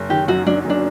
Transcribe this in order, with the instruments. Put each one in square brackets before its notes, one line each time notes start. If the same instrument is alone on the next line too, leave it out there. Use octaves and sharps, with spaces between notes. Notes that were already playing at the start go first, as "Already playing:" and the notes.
Already playing: [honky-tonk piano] F#1
[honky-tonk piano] D#3 [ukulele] G4
[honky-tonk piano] F#2 [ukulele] F#4
[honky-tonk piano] F#3 [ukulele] D4
[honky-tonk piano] F#1 [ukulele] D4